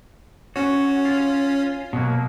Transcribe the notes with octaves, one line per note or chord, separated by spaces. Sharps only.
C#4 F#4 C#5
F4
B2 F#3 A#3